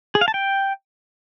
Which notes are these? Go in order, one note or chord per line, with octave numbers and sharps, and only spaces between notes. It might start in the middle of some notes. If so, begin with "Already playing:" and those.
G#4
F5
A5
G5